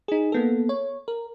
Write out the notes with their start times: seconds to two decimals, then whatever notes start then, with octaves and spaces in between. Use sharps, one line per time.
0.08 D#4 G#4
0.32 A#3 B3 A4
0.69 C#5
1.08 A#4